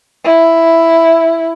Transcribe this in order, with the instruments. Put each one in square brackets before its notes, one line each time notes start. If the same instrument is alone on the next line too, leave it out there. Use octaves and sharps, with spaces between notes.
[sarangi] E4